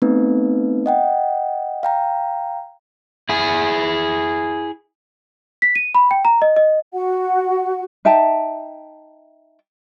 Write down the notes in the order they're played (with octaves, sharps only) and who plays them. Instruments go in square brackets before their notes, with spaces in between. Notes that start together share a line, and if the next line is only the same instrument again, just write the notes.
[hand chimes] A3 B3 C4 D#4 B4
D#5 F#5 G5
F5 G5 A#5
[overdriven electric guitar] E4 G#4
[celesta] B6
D#7
B5
G5
A#5
D#5
D#5
[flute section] F#4 F#5
[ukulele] D#4 E5 G5 A5